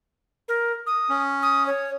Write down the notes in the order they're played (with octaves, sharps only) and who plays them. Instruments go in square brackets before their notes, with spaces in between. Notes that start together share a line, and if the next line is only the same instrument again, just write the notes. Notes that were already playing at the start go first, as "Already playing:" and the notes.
[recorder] A#4
D#6
[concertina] C#4
[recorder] D#6
C#5